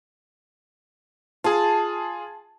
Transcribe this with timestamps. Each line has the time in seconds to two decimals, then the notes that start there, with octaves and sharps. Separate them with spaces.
1.44 F4 G#4 A5